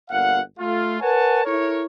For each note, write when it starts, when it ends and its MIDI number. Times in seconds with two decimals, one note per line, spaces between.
0.10 0.40 31
0.10 0.40 46
0.10 0.40 77
0.10 0.40 78
0.59 0.99 57
0.59 0.99 65
1.00 1.45 70
1.00 1.45 71
1.00 1.45 73
1.00 1.45 78
1.00 1.45 80
1.00 1.45 81
1.45 1.85 64
1.45 1.85 69
1.45 1.85 70
1.45 1.85 73